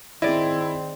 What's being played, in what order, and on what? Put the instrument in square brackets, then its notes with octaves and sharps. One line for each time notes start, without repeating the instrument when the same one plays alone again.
[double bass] D#3 C4 [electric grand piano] E4 [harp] G#4 D5 D#5